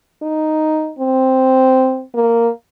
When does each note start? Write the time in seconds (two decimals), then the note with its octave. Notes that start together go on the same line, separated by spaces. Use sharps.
0.22 D#4
0.99 C4
2.15 A#3